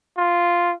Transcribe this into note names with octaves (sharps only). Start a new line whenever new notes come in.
F4